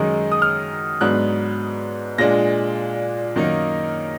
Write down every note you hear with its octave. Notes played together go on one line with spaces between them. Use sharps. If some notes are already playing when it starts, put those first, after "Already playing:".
Already playing: F#2 D#3 G#3 D#4
D#6
F6
G#2 F#3 B3 D4 F#6
A#2 G#3 D4 A#6
F#2 D#3 A#3 D#4